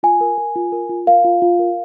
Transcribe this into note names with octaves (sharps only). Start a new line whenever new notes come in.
F4 G#5
A#4
A#4
F4
A#4
F4
A#4 F5
F4
F4
A#4